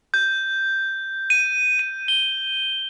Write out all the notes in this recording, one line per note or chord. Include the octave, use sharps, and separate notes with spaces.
G6
D#7
D#7
G7